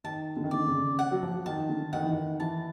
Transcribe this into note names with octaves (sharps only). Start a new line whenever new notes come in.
D#3 A5
D3
D#3
D3 D5
C#3
F#5
F#3
F3
D#3 A5
D3
D#3 F#5
E3
D#3
E3 A5